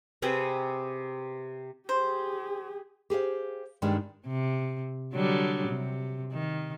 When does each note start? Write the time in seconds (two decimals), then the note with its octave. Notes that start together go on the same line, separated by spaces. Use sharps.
0.22 C3 C4 G#4 B4
1.89 G4 G#4 C5
3.10 G4 G#4 C5 F5
3.82 G2 D#3 G3 G#3 D4
4.27 C3
5.13 D3 F#3 G3
5.68 C3
6.33 D#3